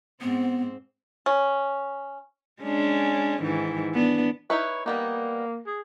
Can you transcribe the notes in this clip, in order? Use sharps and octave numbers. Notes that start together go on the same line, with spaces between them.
G#2 B3 C4
C#4
G#3 C#4 D4
G#2 D#3 E3
B3 D4
D#4 E4 B4 C#5
G3 A#3 B3 D#4
G#4